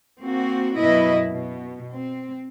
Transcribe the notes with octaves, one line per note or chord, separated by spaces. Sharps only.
A#3 C4 F#4
F#2 B2 E4 B4 D#5
B2
C4